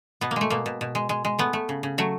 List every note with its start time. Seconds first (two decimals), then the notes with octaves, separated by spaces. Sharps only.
0.21 B2 B3
0.31 A#3
0.36 G#3 A3
0.50 B2 A#3
0.66 B2
0.81 B2
0.95 G#3
1.09 G#3
1.25 G#3
1.39 A3 B3
1.53 A3
1.69 C#3
1.83 C#3
1.98 F#3 A3